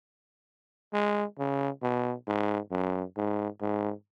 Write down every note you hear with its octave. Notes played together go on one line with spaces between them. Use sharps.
G#3
C#3
B2
G#2
F#2
G#2
G#2